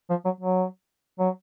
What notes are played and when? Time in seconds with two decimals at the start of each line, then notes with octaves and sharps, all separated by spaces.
0.10 F3
0.25 F#3
0.40 F#3
1.20 F#3